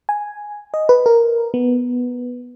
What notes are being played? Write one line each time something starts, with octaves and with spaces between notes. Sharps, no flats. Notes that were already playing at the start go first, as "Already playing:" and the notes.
G#5
D#5
B4
A#4
B3